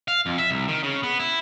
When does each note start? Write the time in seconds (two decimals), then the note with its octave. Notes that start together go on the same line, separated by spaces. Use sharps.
0.08 F5
0.26 F2
0.38 E5
0.51 C2
0.68 D#3
0.83 C#3
1.03 B3
1.20 E4